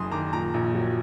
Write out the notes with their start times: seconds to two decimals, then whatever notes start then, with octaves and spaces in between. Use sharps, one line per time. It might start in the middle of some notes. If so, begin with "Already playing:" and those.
Already playing: F#1 F#2 C6 D#6
0.11 D#3 A#5 D6
0.33 A#2 A#5 D6
0.54 A#1
0.75 F#3